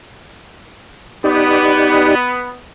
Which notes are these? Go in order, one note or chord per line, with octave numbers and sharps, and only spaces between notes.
B3 D#4 G4 D5